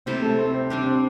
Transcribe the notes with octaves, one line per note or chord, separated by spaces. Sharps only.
C3 G3 C4 E4 A4
A3
C4
C4
G3 C4 D4 G4
C4